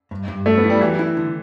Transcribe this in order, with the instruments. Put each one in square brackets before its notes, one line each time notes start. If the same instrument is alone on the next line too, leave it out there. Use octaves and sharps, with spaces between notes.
[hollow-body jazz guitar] G2
G2
[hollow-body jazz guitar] F#3 [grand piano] A3
[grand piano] B3
[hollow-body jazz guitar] E4
[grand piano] G3
[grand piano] E3 [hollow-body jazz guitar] F#3
[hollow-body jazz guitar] E4
D3